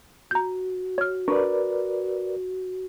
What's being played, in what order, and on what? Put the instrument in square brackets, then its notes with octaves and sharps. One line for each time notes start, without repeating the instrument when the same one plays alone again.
[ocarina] F#4 [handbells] A#5 G6
[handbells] C#5 F6
[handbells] D4 C#6 [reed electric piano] A#4 B4 D5